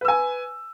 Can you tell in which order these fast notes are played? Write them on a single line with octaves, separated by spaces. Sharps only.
B4 E6 G#5